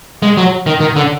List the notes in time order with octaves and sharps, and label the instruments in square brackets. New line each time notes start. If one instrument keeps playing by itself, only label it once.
[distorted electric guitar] G#3
F#3
D#3
D#3
D3